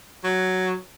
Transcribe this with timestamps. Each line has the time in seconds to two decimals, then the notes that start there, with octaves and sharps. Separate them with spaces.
0.24 F#3